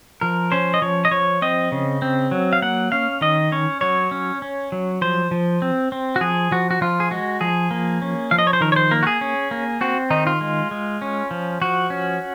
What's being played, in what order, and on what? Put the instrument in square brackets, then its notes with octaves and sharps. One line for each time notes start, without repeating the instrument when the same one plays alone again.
[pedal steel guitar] F3 A#4
C#4 C5
D#5
F3 C#5
D#5
F3 C#5
C4 D#5
C#3
C4
F#3
F5
A#3 F#5
C#4 F5
D#3 D#5
C#4 C#5
F#3 C#5
C#4
C#4
F#3
F3 C5
F3
C4
C4
F#4
F3 G#4
F3 F#4
F#4
F3 F4
G#4
G#3 F#4
F3 G#4
A#3
C#4
F3 F5
D#5
C#5
C5
D#3 A#4
C#5
C5
A#3 A#4
F#4
G#4
C#4
A#3
C4 F#4
D#3 D#4
F4
G#3
G#3
C#4
F3
F3 F#4
C#4